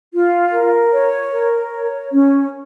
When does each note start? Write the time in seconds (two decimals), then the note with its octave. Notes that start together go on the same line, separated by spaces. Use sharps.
0.12 F4
0.52 A#4
0.92 C#5
1.31 A#4
1.72 C#5
2.12 C#4